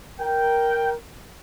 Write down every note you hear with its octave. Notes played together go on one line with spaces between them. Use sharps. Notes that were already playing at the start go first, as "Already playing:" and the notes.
A#4 G5